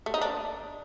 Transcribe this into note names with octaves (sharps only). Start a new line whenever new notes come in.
A3
D#4
D4